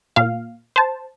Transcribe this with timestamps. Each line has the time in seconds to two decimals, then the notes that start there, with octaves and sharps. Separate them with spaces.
0.16 A#2 F5
0.76 C5 A5